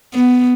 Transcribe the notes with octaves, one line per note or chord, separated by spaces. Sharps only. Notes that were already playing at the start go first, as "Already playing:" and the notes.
B3